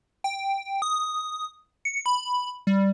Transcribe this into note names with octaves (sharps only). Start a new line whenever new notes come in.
G5
D#6
C#7
B5
G3